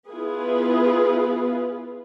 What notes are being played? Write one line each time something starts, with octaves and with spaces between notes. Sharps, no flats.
B3 E4 F4 G#4 B4